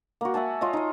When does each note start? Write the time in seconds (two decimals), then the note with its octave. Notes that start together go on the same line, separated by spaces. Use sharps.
0.21 A#3 F#4
0.34 E5 F#5 G#5 A5
0.61 F4 C#5 D#5
0.73 D#4 D#5